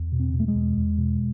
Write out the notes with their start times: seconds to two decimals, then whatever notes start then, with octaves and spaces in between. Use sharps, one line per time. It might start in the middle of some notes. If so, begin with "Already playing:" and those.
Already playing: E2
0.12 B2
0.20 C4
0.34 B2
0.40 A3
0.48 G#3
0.55 E2
0.77 E2
0.98 B2